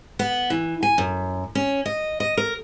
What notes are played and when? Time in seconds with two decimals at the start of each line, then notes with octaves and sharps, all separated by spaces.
0.19 B3
0.50 E3
0.83 G#5
0.98 F#2
1.55 C#4
1.85 D#5
2.20 D#5
2.37 A#4